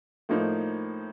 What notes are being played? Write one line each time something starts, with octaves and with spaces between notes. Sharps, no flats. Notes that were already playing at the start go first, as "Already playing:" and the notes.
A2 F3 A#3 D#4